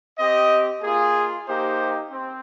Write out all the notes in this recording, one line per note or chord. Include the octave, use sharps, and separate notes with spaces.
C4 G4 D#5
A#3 F4 G#4
A#3 D#4 G4 C5
C4